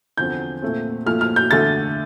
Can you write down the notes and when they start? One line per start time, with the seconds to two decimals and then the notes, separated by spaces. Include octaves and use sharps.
0.17 E2 D3 F3 C4 G6
0.62 A#2 A3 C4
1.06 A#2 F3 A3 F6
1.21 F6
1.36 G6
1.50 E2 D3 A3 A6